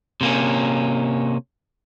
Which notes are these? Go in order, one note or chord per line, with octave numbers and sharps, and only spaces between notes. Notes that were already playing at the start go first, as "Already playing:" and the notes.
C3 A#3 C#4